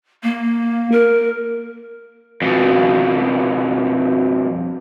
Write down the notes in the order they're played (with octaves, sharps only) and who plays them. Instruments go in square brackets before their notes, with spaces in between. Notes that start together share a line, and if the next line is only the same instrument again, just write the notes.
[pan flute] A#3
A#4
[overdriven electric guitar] F2 B2